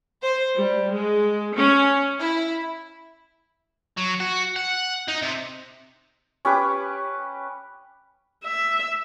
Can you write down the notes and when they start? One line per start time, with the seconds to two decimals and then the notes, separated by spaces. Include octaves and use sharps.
0.22 C5
0.57 G3
0.93 G#3
1.55 C#4
2.19 E4
3.97 F#3
4.20 F#4
4.56 F#5
5.08 D#4
5.22 C3
6.45 C#4 G4 B4 D6
8.44 E5